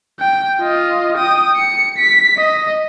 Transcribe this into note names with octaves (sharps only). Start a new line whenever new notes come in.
G5
F4 D#5
G5 D#6
C#7
B6
D#5